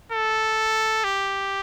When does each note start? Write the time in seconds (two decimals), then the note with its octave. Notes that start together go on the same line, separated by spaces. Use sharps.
0.12 A4
1.04 G4